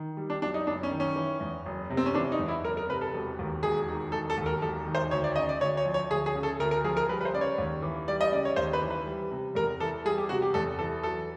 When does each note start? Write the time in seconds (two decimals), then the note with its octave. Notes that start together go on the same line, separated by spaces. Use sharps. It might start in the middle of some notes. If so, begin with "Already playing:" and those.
Already playing: D#3
0.17 G3
0.30 D4
0.42 F#2 D4
0.54 D#4
0.67 F#1 D4
0.83 C#4
0.91 D#3
1.00 C#4
1.16 E3
1.41 E2
1.66 F#1
1.90 C3
1.97 C4
2.06 C#4
2.15 E3 D4
2.32 D#4
2.39 E2
2.48 E4
2.65 F#1 A#4
2.77 A#4
2.89 C3 B4
3.01 A4
3.14 E1
3.39 D#2
3.63 E1 G#4
3.89 D#3
4.12 E1 A4
4.30 A4
4.38 D#2
4.46 A#4
4.62 E1 A4
4.86 D#3
4.95 C5
5.11 D2 C#5
5.24 D5
5.36 C#3 D#5
5.49 D5
5.61 D2 C#5
5.77 C#5
5.86 F3
5.94 C#5
6.10 D2 G#4
6.26 G#4
6.35 C#3
6.43 A4
6.60 D2 A#4
6.71 A#4
6.84 F3 G#4
6.97 A#4
7.09 G3 B4
7.21 B4
7.25 C5
7.34 C#3 D5
7.41 C#5
7.58 D#2
7.82 E3
8.08 G3 D5
8.21 D#5
8.32 C#3 D5
8.45 C#5
8.56 D#2 C5
8.73 B4
8.82 E3
8.90 B4
9.06 G3
9.31 C3
9.55 E2 A#4
9.80 E3 A4
10.05 G3 G#4
10.18 G4
10.29 C3 F#4
10.42 G4
10.54 E2 A4
10.79 E3 A4
11.03 F#3 A4